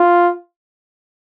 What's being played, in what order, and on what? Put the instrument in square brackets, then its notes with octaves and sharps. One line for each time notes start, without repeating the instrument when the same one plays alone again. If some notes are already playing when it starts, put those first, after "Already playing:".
Already playing: [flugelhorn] F4